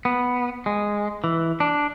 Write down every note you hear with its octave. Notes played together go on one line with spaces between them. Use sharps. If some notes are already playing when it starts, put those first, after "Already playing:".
B3
G#3
E3
D4